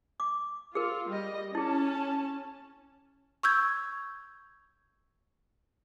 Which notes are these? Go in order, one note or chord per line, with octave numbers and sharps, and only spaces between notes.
D6
F4 G#4 A#4
G3 D#5
C#4 E4 G#4 A5
C#6 E6 G6 G#6